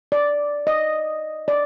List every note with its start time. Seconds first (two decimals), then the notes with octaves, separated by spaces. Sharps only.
0.12 D5
0.67 D#5
1.48 D5